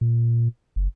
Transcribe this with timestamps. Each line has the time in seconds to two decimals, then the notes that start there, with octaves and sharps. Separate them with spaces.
0.01 A#2
0.76 F#1